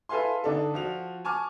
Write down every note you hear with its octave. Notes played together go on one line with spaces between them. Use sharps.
E4 A4 B4 F5 G#5 C6
D3 D4 D#4 A4
F3 F#4 F7
G#5 A5 C#6 D6 F6